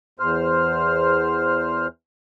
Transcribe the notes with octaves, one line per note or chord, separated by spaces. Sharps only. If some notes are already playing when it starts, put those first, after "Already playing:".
E2 C5 F6